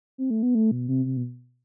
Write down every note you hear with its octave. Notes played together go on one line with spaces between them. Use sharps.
C4
A3
B3
A3
B2
C3
C3
B2